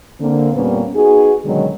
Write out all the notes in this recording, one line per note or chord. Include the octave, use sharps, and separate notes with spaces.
D3 A#3 C4
F2 A#2 G3 A#3 B3 C#4
B3 D#4 F#4 G#4
B2 D3 D#3 F#3 G#3 C#4